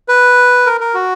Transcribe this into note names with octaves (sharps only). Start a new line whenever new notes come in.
B4
A#4
A#4
F#4